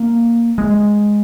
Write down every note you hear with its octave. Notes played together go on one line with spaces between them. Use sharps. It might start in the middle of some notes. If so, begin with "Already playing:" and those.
Already playing: A#3
G#3